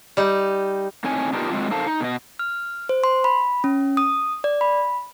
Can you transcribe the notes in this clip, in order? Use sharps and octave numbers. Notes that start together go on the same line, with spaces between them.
G3 D#4
A2 C4 D#4 C#5 G#5
B3 D4 D#4 F4 G4 A#4
F#3 G#3 C4 F4
D#4 A4 A#4 C5 F5 A5
D#4
B2 D#5
F6
C5
C6
B5
C#4
D#6
D5
B5